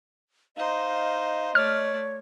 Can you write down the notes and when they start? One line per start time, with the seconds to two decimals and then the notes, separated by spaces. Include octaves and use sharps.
0.57 D#4 C5 D#5 F5
1.55 A3 C#5 D5 F6